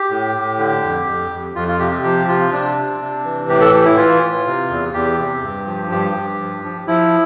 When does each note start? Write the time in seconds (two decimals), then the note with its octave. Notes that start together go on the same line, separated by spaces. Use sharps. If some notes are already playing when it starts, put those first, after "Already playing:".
Already playing: G4
0.10 A2
0.35 A2
0.59 D3
0.83 F2
1.07 F2
1.31 F2
1.55 F2 F4
1.68 F4
1.79 C3 G4
1.92 G4
2.03 F3 G4
2.28 C3 F4
2.52 C3 D4
2.76 C3
3.00 C3
3.25 E3
3.49 A2 G4
3.61 A4
3.73 A2 G4
3.85 E4
3.97 E3 F4
4.22 A2
4.46 C3
4.70 E2
4.94 E2 G4
5.18 C3
5.42 G2
5.66 F3
5.91 G2 G4
6.15 G2
6.39 F3
6.63 F3
6.87 F3 E4